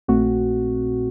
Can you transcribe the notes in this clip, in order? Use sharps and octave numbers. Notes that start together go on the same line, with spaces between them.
A#1 A#2 A3 C4 F#4